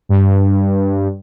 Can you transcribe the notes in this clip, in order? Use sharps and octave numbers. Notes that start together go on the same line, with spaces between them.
G2